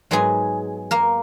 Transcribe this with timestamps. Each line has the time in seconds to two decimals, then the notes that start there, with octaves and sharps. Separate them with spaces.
0.11 G#2 F#3 G#3 B3 G#4
0.91 A#3 A#4